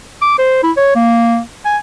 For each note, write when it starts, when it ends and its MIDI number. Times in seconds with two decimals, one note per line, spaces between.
0.22 0.35 86
0.38 0.61 72
0.63 0.71 64
0.77 0.93 73
0.95 1.40 58
1.65 1.77 80